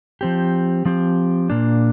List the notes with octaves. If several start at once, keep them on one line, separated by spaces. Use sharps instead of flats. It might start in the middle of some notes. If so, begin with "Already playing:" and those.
F3 C4 G4
F3 C4 G4
A#2 A#3 D4